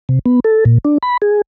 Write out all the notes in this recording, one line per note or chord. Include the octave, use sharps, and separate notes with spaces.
C3
B3
A4
A#2
D4
B5
G#4